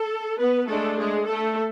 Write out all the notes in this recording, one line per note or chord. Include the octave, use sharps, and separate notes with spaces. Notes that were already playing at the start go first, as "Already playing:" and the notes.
Already playing: A4
B3 B4
G#3 A3 D4 A4
G#3 G#4
A3 A4